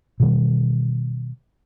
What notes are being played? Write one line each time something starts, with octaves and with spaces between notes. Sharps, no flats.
B2 D#3 G3